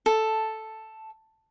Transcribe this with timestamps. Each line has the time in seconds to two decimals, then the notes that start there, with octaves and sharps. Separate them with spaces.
0.06 A4